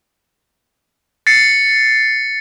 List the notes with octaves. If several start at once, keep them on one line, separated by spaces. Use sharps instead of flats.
A6 C7 C#7